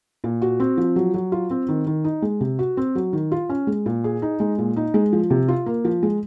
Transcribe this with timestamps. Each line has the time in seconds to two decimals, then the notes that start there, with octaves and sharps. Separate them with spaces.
0.24 A#2
0.42 F#4
0.60 C4
0.77 F3
0.96 F#3
1.14 F#3
1.32 F4
1.51 C4
1.68 D#3
1.87 D#3
2.04 D#4
2.22 G#3
2.41 C3
2.59 F#4
2.77 C4
2.95 F#3
3.13 D#3
3.32 F4
3.49 C#4
3.67 G#3
3.86 A#2
4.04 G#4
4.22 D#4
4.40 G#3
4.58 A#2
4.76 D#4
4.94 G#3
5.13 F3
5.30 C3
5.48 F4
5.66 A#3
5.85 F3
6.03 G#3